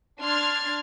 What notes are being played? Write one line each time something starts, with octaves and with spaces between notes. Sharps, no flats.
D4 C6 F6 G#6 A6